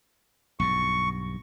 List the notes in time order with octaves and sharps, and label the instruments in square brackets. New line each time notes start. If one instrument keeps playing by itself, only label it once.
[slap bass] B1 G2 [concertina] C#6